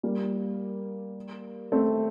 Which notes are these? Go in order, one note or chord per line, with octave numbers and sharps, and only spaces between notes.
G3 A#3
A3 C4